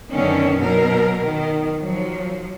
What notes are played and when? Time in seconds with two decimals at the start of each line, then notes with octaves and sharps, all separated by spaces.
0.12 F#2 D3 D#3 B3 C#4
0.60 B2 F#3 A#4
1.25 D#3
1.78 F3 F#3